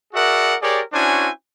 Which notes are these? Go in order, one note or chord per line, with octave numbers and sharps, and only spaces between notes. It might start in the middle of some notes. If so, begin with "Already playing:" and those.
F#4 G#4 A#4 D5 E5 F#5
G4 G#4 A#4 C#5 D5
C#4 D4 E4 F#4 C5 G#5